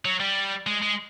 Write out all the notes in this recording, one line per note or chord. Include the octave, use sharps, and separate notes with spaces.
F#3
G3
G#3
G#3